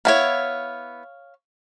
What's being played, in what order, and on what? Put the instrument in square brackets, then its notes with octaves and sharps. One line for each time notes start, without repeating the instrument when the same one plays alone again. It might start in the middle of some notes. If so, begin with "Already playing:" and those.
[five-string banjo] B3 E4 [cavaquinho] C#5 F5